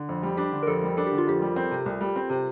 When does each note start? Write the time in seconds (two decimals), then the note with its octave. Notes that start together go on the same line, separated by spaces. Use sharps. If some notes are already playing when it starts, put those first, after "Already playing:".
Already playing: D3
0.09 F2
0.23 G3
0.37 D4 G4
0.52 D3
0.63 A#4
0.67 F2 A4
0.83 G3
0.97 D4 A4
1.07 D3 G4
1.18 F4
1.27 F2 G4
1.42 G3
1.56 C4
1.72 C3
1.86 C2
2.01 G3
2.16 C4
2.30 C3